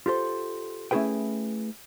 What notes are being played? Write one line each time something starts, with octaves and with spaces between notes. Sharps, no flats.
F4 G4 A4 C5
A3 C#4 E4 G#4 B4 G5